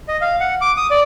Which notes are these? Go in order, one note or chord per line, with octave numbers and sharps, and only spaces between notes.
D#5
F5
F#5
D6
D#6
D5